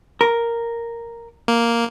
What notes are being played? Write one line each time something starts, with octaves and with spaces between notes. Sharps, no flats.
A#4
A#3